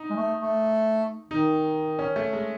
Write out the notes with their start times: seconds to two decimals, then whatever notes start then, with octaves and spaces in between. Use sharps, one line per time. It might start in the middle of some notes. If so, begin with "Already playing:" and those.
Already playing: D#4
0.10 G#3
0.16 A3
0.39 A3
1.30 D#3 D#4
1.99 C#4
2.16 A3
2.33 G#3